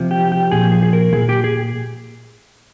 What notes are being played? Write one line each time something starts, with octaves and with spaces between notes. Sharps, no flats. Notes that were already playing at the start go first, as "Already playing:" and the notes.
Already playing: C3 F3
G4
G4
A#2 F3 G#4
G#4
G#4
A#4
A#2 F3 G#4
G4
G#4